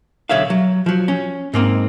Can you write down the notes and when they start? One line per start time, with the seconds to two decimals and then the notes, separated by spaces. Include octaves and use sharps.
0.29 B1 D3 C#5 E5 F5
0.50 F#3
0.86 F3 F#3
1.08 C#4
1.54 G#2 A#3 C4 D#4